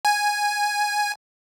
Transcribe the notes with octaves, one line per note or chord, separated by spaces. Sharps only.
G#5